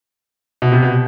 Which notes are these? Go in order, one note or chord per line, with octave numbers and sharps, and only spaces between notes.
B2
C3
B2